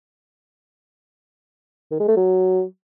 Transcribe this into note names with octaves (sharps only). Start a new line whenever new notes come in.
D#3
G#3
A3
F#3